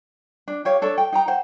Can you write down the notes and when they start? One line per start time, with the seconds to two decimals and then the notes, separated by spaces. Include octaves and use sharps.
0.48 D4
0.65 G4 C#5 F5
0.82 D4 A4 C#5
0.98 G5
1.12 D#4 G5 A#5
1.28 C5 F#5